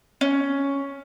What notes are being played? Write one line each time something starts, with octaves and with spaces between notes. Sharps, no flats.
C#4